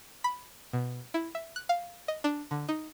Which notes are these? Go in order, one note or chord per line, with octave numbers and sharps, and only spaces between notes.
B5
B2
E4
E5
F#6
F5
D#5
D4
D3
D#4